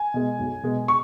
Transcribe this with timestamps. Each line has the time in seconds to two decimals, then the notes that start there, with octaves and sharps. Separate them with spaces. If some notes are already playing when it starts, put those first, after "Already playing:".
Already playing: G#5
0.14 B2 G#3
0.39 B1
0.63 B2 G#3
0.88 C#6